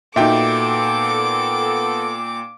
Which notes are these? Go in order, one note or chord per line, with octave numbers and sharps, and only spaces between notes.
A#2 B3 D#4 F#4 A4 E5 G5 D6